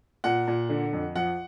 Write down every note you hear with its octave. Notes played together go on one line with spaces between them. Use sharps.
A#2 F#5
A#2
D3
F2
F3 F#5